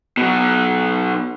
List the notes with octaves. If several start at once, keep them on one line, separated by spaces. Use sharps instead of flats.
B2 F#3